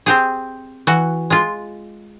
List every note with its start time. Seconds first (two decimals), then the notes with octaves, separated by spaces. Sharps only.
0.06 C4 G4 G#4
0.87 E3 F#4
1.30 G#3 F4